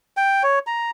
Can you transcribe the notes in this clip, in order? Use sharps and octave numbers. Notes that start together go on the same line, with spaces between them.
G5
C#5
A#5